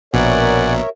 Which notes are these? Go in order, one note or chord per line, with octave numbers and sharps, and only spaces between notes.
A#1 B2 A#4 C#5 D5 E5 F#5 G#5